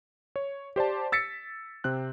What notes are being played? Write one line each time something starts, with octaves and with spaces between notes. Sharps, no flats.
C#5
G4 C5 D5 A5
E6 A6 B6 C#7
C3 C4 F#6